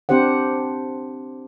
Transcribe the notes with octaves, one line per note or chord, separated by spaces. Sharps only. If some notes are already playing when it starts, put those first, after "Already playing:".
C4 D4 G4 C5 F#5